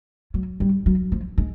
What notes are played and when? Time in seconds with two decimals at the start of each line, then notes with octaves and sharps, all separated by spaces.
0.34 F#3
0.60 G3
0.86 F#3
1.12 F3
1.38 G#3